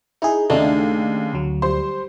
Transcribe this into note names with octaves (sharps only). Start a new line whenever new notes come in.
D#4 E4 G#4
D#2 C#3 A3 D4 D#4
D2 F#3
G3 C5 C6